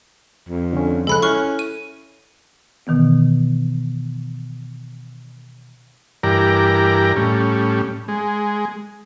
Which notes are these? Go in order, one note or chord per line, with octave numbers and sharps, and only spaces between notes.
F2
D3 C#4
C#2 F3 G#3 A4 B5 F#6
C#4 E4 C#6 F6
D#7
B2 D#3 E3 B3
G2 E3 G4 A#4 D5 A#5
A2 G3 C#4
G#3